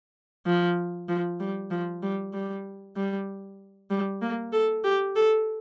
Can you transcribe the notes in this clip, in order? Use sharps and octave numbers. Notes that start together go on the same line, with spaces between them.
F3
F3
G3
F3
G3
G3
G3
G3
A#3
A4
G4
A4